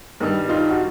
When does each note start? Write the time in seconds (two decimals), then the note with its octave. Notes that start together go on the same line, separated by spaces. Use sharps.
0.20 G2 D#3 G3
0.49 D#4 F4
0.71 F#4